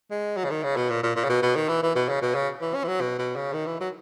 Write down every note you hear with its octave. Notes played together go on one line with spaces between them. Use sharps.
G#3
F#3
C#3
D#3
C#3
B2
A#2
A#2
A#2
C#3
B2
B2
D#3
E3
E3
B2
C#3
B2
C#3
E3
C#4
E3
F#3
B2
B2
C#3
D#3
E3
F#3